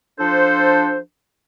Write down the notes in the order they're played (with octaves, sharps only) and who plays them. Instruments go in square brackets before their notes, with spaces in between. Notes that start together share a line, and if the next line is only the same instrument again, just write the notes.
[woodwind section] F3 D4 A4 C5